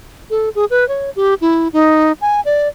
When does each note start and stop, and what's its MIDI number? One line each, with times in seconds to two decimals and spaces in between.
0.30 0.49 69
0.55 0.65 68
0.70 0.87 71
0.88 1.10 73
1.16 1.34 67
1.41 1.68 64
1.73 2.12 63
2.21 2.40 80
2.45 2.68 74